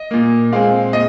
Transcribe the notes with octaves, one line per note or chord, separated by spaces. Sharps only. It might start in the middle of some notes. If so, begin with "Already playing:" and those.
Already playing: D#5
A#2 A#3
A#2 G#3 C4 F5
A#2 D#5